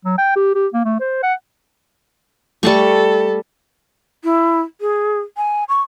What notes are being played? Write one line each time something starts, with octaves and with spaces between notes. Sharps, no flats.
F#3
G5
G4
G4
A#3
A3
C5
F#5
G3 A3 A4 A5 C#6
E4
G#4
G#5
C#6